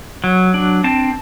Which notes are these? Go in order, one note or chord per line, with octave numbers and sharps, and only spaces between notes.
F#3
D4
C4 A5